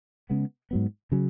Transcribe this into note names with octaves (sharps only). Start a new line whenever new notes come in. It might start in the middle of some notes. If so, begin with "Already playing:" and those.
C#3 G#3 B3
G#2 F#3 B3
C#3 F#3 C#4